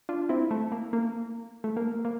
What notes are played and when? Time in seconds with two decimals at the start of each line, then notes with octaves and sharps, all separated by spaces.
0.09 D4 F4
0.29 C4 E4
0.51 A3
0.72 A#3
0.93 A#3
1.64 A3
1.77 A#3
2.05 A#3